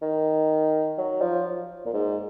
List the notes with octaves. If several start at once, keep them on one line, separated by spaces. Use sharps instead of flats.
D#3
F#3
F3
A#2
G#2